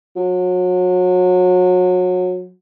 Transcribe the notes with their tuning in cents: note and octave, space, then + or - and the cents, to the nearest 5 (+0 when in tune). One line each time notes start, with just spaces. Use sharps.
F#3 -30